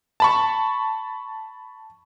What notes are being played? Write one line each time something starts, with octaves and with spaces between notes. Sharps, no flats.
A5 B5 C#6